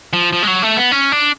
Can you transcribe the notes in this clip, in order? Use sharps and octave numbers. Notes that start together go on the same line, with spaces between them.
F3
F3
G#3
F#3
A3
B3
C#4
D4